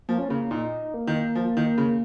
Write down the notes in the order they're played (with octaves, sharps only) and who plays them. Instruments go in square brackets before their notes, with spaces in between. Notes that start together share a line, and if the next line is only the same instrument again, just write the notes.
[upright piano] F3 [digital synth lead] A#3
[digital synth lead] C#4
[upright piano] C#3 [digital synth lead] A#3
[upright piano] A#2 [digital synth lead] D#4
[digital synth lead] A#3
[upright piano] D#3
F3
D#3
C#3